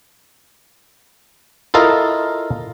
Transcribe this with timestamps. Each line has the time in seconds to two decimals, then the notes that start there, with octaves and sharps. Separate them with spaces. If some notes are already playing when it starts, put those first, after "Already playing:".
1.74 E4 F4 A4 A#4 D#5 F5